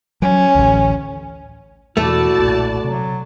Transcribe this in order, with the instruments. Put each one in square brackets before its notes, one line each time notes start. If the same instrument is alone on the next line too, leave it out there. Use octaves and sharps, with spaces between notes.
[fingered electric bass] F#3 [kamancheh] C#4
[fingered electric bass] A1 D2
[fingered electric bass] E2 B2 [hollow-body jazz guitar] A3 [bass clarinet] E4 [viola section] F#4 D5 A5
[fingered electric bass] F#1 B1 A#2
[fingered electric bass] C3 [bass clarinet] F#3